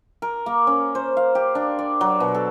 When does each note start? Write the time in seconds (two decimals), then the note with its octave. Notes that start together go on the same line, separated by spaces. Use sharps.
0.22 A#4
0.46 A#3
0.67 C#4
0.95 C5
1.17 F5
1.35 G4
1.55 D4
1.79 D5
2.01 F#3
2.20 B2
2.35 A4